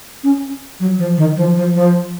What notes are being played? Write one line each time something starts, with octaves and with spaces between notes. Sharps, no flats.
C#4
F#3
F3
D#3
F3
F3
F3